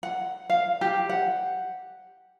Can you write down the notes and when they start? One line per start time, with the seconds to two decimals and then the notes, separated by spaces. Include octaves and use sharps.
0.03 F#5
0.50 F5
0.81 G4
1.09 F#5